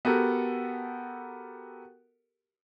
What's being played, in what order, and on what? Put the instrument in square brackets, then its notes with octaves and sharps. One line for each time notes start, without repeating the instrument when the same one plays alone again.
[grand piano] B3 F#4 G4 A4 A#4